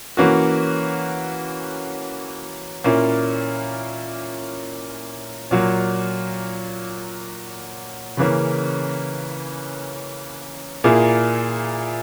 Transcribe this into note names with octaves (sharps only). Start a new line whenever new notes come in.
E3 A#3 C#4 F#4
A#2 A#3 C#4 E4
A#2 F#3 A#3
C#3 E3 A#3 C#4
A#2 A#3 E4 G#4